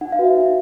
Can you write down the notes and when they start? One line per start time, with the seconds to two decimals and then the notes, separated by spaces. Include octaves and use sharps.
0.01 D#4 F#5
0.12 F5
0.19 F#4 B4
0.24 E5
0.37 D#4 E5